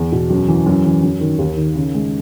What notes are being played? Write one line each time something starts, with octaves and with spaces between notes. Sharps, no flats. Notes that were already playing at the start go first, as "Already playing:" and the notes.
Already playing: E2
B2
F#2
E3
F#2
E3
F#2
D#3
D#2
D#3
C#3
G#3